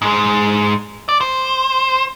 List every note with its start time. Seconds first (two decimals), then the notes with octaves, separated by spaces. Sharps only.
0.02 G#2 G#3
1.09 D5
1.21 C5